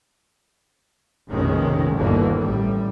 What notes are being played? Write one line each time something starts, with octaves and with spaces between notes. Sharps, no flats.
F1 A#1 B2 D#3 G#3 C#4
G1 D#2 B2 D3 E3 A#3
A1 A2 G3